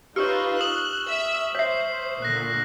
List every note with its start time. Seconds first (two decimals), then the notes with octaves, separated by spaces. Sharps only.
0.16 D#4 F4 G4 B4 C#5 C#6 E6 F6
0.61 D#6 F#6 E7 F#7
1.08 E5 E6
1.55 C5 C#5 E5 B6 C7
2.22 A#2 D3 F#6 A#6